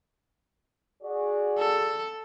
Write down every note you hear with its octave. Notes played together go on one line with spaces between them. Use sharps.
F#4 G#4 D5
A4